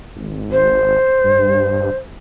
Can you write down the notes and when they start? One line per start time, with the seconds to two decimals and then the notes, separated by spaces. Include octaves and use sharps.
0.16 G#1
0.52 C5
1.24 G2